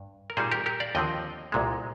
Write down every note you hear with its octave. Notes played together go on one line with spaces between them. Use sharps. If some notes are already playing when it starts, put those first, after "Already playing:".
Already playing: G2
A#4
A#2 G3 A#3 D#4 G#4 C5
G4 A#4
G4 A#4
D5 F5
D#2 D3 F3 C4 D#5 G5
C2 A#2 G#3